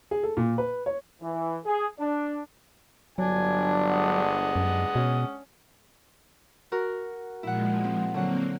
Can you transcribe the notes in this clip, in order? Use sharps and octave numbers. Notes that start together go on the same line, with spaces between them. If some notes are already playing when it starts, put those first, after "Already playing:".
G#4
A4
A#2
B4
C#5
E3
G#4
D4
G1 F#3 D4 G#5
G#3 F#5 D#6
F#2
B2 C#4
F#4 A#4
A#2 F3 G#3 E4 F#5
C4
D3 F#3 A#3 C4 F#5